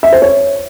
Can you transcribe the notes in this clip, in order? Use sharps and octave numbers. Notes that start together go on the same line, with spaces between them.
E5
C5
C#5